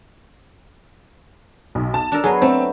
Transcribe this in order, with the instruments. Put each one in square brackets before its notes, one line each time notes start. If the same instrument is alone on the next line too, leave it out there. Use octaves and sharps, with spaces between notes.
[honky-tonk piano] B1
A5
[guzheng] D4 A4 A#4
[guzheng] F#3 B3 [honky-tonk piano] G#4
[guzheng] A3 [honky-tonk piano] C4